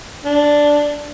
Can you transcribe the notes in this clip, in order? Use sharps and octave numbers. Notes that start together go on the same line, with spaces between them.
D4